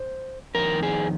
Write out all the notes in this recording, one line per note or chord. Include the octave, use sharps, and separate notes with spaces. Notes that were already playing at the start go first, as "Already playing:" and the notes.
Already playing: C5
F2 D#3 A#4
G#4